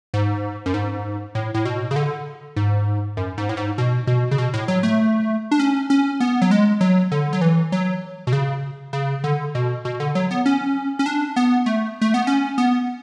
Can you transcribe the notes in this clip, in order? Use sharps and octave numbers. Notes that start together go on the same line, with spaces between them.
G#2
F#2
G#2
A2
A2
B2
C#3
D3
G#2
F#2
G#2
A2
G#2
B2
B2
C#3
B2
A2
F#3
A3
D4
C#4
C#4
B3
F#3
G#3
F#3
D3
F#3
E3
F#3
B2
C#3
C#3
D3
B2
B2
D3
F#3
B3
C#4
C#4
D4
B3
A3
A3
B3
C#4
B3